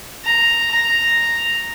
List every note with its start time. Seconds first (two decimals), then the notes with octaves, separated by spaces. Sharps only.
0.25 A#5
0.71 A#5